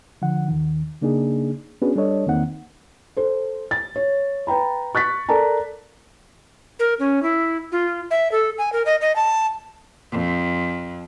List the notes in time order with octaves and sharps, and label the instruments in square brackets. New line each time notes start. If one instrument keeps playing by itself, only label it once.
[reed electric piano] D3 F3 F#5
D#2 D#3
C#3 A#3 D4 D#4 G#4
B3 C#4 D4 F#4 G#4 B4
G3 D4 A4 C#5 D#5
E2 D#3 A#3 C4 D#4 F#5
[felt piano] A4 C5
A6
C#5
B4 G5 A#5 B5
C#6 F#6 A6 B6
A4 A#4 D5 A5 A#5
[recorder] A#4
C#4
E4
F4
E5
A4
G#5
A#4
D#5
D#5
A5
[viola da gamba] F2